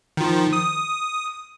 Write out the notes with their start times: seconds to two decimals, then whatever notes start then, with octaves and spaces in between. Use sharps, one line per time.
0.17 D#3 F3
0.53 D#6